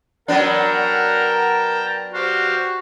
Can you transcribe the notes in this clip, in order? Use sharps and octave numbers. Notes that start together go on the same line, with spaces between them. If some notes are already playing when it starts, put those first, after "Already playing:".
F#3 B3 D4 A#4 F#5 G5 A5 A#5
F#4 G4 C5 F5